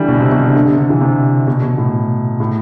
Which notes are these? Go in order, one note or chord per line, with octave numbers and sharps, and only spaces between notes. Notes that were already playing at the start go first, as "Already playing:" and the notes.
Already playing: D3 E3 G3
B2
C3
B2
D3
D3
C3
D3
E3
C3
B2
B2
A2
A2